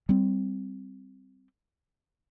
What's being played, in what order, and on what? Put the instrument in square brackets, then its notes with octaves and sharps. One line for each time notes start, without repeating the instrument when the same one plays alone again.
[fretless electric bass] G3 C4